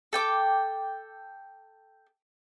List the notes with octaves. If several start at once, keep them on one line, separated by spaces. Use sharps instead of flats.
A4 G5 D6